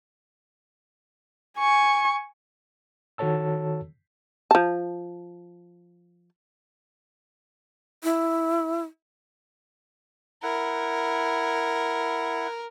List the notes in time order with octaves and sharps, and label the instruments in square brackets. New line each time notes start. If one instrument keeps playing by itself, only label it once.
[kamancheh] G#5 C#6
[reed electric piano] D#3 F#4 A4 C#5 A5 E6
[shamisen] F3 A5
[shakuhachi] E4
[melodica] E4 F#5 [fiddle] A#4